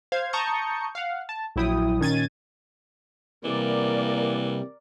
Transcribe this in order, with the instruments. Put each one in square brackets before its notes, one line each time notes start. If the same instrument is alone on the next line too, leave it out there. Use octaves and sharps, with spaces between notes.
[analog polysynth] C5 F5 G#6
A5 A#5 C#6 D#6 G6 C#7
F5 F#5
A5
A#1 F#3 E4 G5 D#6
A#2 D#3 C#4 G#6 A6 D#7
[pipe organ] C3 G3 [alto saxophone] E3 [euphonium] A#3 [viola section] A#4 D5